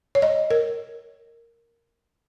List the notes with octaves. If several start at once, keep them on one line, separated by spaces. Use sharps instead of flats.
C#5
D#5
A#4